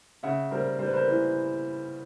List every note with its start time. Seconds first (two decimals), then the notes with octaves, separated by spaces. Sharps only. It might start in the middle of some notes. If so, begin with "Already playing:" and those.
0.23 C#3 E5 F#5
0.51 G3 A#4 C5
0.79 G3 C5
0.86 B4
0.93 A#4 C5
1.08 E3